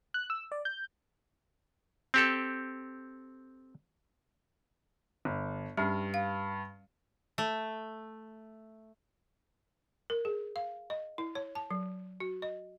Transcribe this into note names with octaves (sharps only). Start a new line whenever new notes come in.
F#6
E6
D5
G6
C4 G4 A4
G1
G2 G3 C#4
F5
A3
A#4
G#4
F5
D#5
E4
C#5
A5
F#3
F#4
D#5